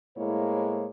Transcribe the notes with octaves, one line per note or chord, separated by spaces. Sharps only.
A2 G#3 A#3 E4 C5 C#5